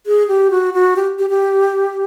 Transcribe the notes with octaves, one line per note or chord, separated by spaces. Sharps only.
G#4
G4
F#4
F#4
G4
G4
G4